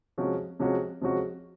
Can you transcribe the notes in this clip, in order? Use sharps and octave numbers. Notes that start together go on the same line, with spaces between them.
C3 F3 G#3 C#4 F#4
C3 F3 G#3 C#4 F#4
C3 F3 G#3 C#4 F#4